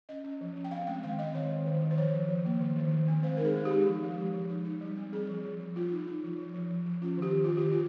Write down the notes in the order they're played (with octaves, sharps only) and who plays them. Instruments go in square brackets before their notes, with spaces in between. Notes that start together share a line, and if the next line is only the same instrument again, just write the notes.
[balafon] C#4 D#5
C#4
F3
C#4
G5
C4 F5
G#3 G5
D#3 F5
C4 D#5
D#3 C#5
D#3
D#3
D#3
C5
F3 C#5
F3
F3
A#3
D#3
D#3
D#3
C4
G#3 C5
A#4
D#4 G#4
G#3
G4
D#4
F3
G#3
F3
F3
D#4
D#4
G3
C4
F3 G#4
F3
F3
F3
F3 F4
D#4
D#4
F3
F3
F3
F3
F3
C#4 F4
D#3 G4
D#3
F4
D#3
G4
D#3
F4